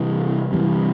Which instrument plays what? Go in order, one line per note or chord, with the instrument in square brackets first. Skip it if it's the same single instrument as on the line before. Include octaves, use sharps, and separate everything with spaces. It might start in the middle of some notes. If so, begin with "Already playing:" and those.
Already playing: [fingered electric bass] C3 E3 G3
C3 E3 G3